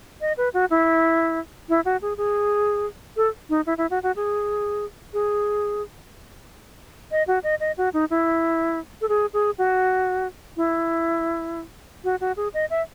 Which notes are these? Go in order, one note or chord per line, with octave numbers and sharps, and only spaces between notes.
D#5
B4
F#4
E4
E4
F#4
G#4
G#4
A4
D#4
E4
E4
F#4
F#4
G#4
G#4
D#5
F#4
D#5
D#5
F#4
D#4
E4
A4
G#4
G#4
F#4
E4
F#4
F#4
G#4
D#5
E5